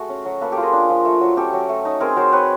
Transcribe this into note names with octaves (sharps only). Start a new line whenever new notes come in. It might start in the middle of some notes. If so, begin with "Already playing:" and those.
Already playing: A3 F#4 G#4
C#4
F#3
A#3 A4 B4
G4 A4
F4
G#4 A#4
D4
F3
A3
F#3
C#4 G4 A4
F#3
A3
D#4
C4 G#4 A#4
F#3 A#4 C5
C4 B4 C#5